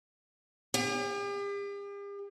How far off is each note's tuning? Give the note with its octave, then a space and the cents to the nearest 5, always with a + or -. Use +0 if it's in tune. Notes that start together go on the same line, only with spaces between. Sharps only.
G4 +45